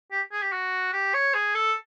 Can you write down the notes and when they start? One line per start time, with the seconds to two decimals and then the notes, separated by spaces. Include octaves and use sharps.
0.12 G4
0.32 G#4
0.42 G4
0.53 F#4
0.93 G4
1.14 C#5
1.34 G#4
1.55 A4